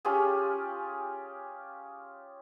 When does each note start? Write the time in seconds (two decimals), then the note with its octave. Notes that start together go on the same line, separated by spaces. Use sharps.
0.05 C#4 F4 G4 G#4